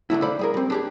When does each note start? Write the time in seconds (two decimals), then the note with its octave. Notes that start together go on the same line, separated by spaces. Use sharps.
0.10 D3 D#3 A3 E4
0.22 A4 C5 D5 F5 B5
0.39 G3 G#4 A#4
0.54 G3 C4
0.70 D4 G4 G#4